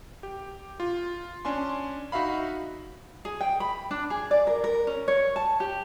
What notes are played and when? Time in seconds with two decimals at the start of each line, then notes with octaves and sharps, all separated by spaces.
0.23 G4
0.80 F4
1.45 C#4 D4 G#5 C6
2.12 D#4 F#4 E5 F5 B5
3.25 G#4
3.41 G5
3.60 B5
3.91 D4
4.10 G#4
4.31 D5
4.47 A#4
4.64 A#4
4.87 C#4
5.08 C#5
5.36 A5
5.60 G4